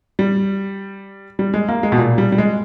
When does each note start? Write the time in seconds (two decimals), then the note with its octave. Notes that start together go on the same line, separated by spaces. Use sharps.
0.19 G3
1.39 G3
1.54 G#3
1.68 A#3
1.83 G#3
1.92 B2
1.98 A#2
2.18 G3
2.32 G3
2.38 G#3